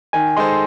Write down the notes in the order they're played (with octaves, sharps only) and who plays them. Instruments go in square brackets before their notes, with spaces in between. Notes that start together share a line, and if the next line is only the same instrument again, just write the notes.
[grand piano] D#3 [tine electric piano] G#5
[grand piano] G#3 D#4 A4 C5 [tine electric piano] C6